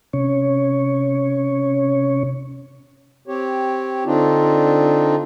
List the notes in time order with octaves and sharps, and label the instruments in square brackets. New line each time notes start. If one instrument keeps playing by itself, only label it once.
[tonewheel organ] C3 C#4 C#5
[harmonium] C4 G4 C#5
D3 C4 D4 D#4 F4